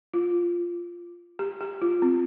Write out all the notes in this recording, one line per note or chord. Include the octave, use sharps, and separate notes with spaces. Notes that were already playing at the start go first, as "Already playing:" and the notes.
F4
G4
G4
F4
C4